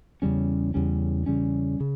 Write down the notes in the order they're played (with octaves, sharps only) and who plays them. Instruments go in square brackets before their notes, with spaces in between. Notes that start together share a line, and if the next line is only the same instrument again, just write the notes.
[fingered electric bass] E2 C#3 G3 C#4
E2 C#3 G3 C#4
E2 C#3 G3 C#4
C#3